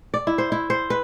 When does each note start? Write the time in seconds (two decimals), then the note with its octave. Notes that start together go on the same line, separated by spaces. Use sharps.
0.14 D5
0.27 E4
0.38 C5
0.52 E4
0.70 C5
0.90 B4